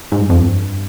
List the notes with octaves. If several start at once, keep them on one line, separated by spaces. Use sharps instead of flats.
G#2
G2
F2
G2